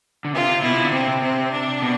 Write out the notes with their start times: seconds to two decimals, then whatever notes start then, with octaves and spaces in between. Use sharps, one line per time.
0.25 D3
0.33 C3 F4
0.63 B2 E4
0.73 C3
0.82 D3
0.92 C3 C4
1.08 C3
1.22 C3 C4
1.52 D4
1.82 B2